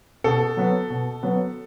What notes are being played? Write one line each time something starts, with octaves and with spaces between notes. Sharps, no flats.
B2 A4
F#3 B3
B2
F#3 B3